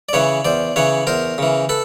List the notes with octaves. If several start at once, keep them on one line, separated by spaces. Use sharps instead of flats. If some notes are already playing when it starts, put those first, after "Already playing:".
D5
C#3 E3 B4 C#5
E2 C5 D5
C#3 E3 B4 C#5
E2 A#4 C5
C#3 E3
A4 B4